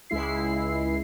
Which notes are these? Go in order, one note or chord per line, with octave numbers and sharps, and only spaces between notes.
C#2 G#3 E4 C7